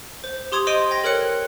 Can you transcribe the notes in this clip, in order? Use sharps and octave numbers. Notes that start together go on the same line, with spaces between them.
C5
G4 C6 D#6 G#6 F7
C5 D#5 C6 D7 D#7
G5 A#6
A4 A#4 C#5 F#6 C#7